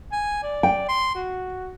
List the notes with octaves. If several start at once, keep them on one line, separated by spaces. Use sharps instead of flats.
G#5
D5
G5
C6
F#4